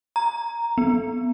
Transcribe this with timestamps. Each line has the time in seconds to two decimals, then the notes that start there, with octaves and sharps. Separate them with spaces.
0.16 A#5
0.78 B3